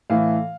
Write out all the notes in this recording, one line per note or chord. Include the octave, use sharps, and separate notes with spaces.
A2 E3 A3 F5